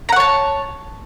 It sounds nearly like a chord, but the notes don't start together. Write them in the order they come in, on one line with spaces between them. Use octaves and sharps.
A#5 F#5 C#5 A5